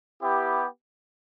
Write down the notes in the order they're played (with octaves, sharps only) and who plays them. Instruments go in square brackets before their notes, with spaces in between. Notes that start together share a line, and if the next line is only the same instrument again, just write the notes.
[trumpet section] B3 E4 G4